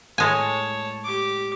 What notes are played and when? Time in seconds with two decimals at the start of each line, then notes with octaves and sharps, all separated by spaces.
0.18 A2 G#3 C#5 G#5 A5
1.04 G4 D6